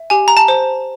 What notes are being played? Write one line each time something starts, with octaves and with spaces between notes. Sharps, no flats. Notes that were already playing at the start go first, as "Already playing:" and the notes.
Already playing: E5
G4 G#5
A#5
A5
C5